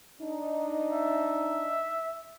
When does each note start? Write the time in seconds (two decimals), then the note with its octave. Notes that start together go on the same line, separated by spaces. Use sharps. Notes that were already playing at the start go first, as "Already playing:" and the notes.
0.21 D4 D#4
0.92 E5